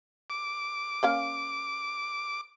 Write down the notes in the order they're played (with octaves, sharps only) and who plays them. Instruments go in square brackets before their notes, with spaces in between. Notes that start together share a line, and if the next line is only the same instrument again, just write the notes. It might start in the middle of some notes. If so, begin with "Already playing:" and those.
[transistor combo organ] D6
[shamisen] A#3 C#4 F5